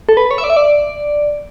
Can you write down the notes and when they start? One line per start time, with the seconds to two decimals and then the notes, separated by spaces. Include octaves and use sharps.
0.09 A4
0.17 B4
0.31 C#5
0.38 E5
0.44 D5
0.50 E5
0.57 D5